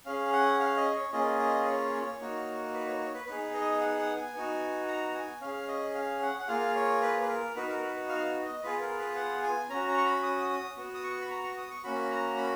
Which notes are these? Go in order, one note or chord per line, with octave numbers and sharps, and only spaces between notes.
C#4 G#4 F5
F#5
F5
D#5
C#5
A#3 C#4 F4 G#4 D#5
D#5
C#5
A#3 D#4 F#4
B4
C#5
C#5
B4
B3 D#4 G#4 B4
D#5
F#5
F#5
G#5
B3 D#4 F#4
A#5
G#5
C#4 G#4 F5
D#5
F5
F#5
F#5
A#3 F4 G#4 F5
C#5
B4
B4
A#4
B3 D#4 F#4 B4
A#4
B4
F5
D#5
B3 F4 G#4 B4
A#4
B4
F#5
G#5
C#4 F#4 A#5
A#5
C#6
B5
D#6
D#6
B3 F#4
D#6
C#6
B5
A#5
C#6
D#6
C#6
A#3 C#4 F#4 B5
A#5
B5